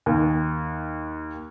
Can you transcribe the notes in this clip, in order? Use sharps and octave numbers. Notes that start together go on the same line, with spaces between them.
D#2